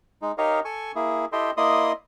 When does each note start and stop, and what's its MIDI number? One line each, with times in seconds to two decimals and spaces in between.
0.22 0.32 56
0.22 0.32 63
0.38 0.60 63
0.38 0.60 67
0.38 0.60 70
0.38 0.60 73
0.38 0.60 75
0.38 0.60 77
0.65 0.92 69
0.65 0.92 80
0.65 0.92 85
0.95 1.25 58
0.95 1.25 64
0.95 1.25 68
1.32 1.51 64
1.32 1.51 67
1.32 1.51 69
1.32 1.51 75
1.32 1.51 79
1.32 1.51 84
1.57 1.92 58
1.57 1.92 64
1.57 1.92 74
1.57 1.92 75
1.57 1.92 84
1.57 1.92 87